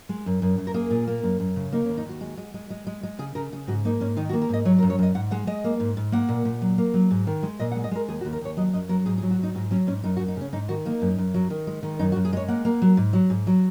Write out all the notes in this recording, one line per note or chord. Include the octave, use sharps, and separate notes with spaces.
G#3
F#2
F#2
F#2
A#4
A#3 G#4
A#2
A#3
F#2
F#2
C#3
A#3 D#4
C#4
D#2
D#4
D#2 F#4
G#3
G#3
G#3
G#3
G#3
G#3
C#3 G#4
C#3 A#4
C#3 G#4
G#2 F#4
A#3 D#4
G#2 C#4
D#3 D#4
F#4
A#3
A#4
G#2 D#5
F#3 C#5
A#4
F#2
C#5
F#2 D#5
G#2 F#5
G#3 F#5
G#3 D#5
A#3
G#2
G#2
A#3 F#5
A#2
A#2
F#3
A#3
F#3
G#2
D#3
G#3
A#2 D#5
F#5
G#3
D#5
G#3 A#4
D#2 G#4
F#4
D#2
A#4
D#2 C#5
F#3 D#5
F#2 D#5
F#3 A#4
G#2 G#4
G#4
F#3
F#4
G#2 D#4
G#2 F#4
F#3 C#4
G#2 C#4
F#2 D#4
F#4
F#2
D#4
C#3 C#4
G#2 D#4
D#3 F#4
A#3 D#4
F#2
F#2
F#3
D#3
G#3
D#3
F#2 D#4
F#4
F#2
G#4
G#3 C#5
A#3 F#5
A#3
F#3
G#2
F#3
G#2
F#3